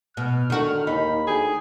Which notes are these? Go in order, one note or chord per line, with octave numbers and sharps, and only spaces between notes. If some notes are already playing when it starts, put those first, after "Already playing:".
B2 F6
D3 D#3 F#4
D#2 D#4 B5
D2 G#4 G5